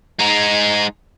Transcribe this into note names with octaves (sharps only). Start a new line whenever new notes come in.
G#3 D#4